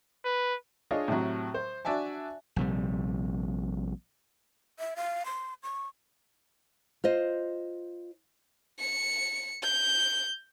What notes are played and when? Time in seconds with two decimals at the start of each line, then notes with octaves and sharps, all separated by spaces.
0.25 B4
0.91 D4 F4 G#4 C#5 D#5
1.08 A2 C3 F#3
1.54 C5
1.85 D4 F#4 D5 E5 G#5 A5
2.56 A#1 C3 G3
4.79 E5
4.96 F5
5.25 C6
5.63 C#6
7.04 F4 C5 D#5
8.79 C#7
9.63 G6